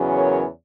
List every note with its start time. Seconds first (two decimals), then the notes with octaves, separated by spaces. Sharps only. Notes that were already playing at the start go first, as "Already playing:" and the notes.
Already playing: E2 C#3 F#3 C#4
0.15 A#4 C#5